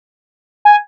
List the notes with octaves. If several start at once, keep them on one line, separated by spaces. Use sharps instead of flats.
G#5